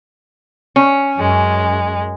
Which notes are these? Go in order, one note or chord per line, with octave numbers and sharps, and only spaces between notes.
C#4
F#2 G#3